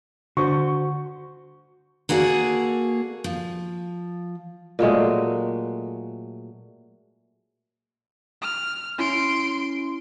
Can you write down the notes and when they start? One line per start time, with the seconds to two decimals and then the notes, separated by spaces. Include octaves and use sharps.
0.37 D3 F#4 C5 C#6
2.09 A#3 F#4 G#4 A4 D5
3.24 F3
4.79 A#2 F#3 G#3 A3
8.42 F6
8.99 C#4 E4 C6 D7